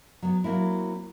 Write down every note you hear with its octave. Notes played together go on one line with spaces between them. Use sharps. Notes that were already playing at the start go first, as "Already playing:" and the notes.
F#3 B3
F#3 A#3 C4 E4